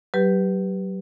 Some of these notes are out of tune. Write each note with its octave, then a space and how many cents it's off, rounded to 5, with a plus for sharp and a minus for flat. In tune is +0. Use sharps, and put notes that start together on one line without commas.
F#3 +35 G4 +0 B4 +0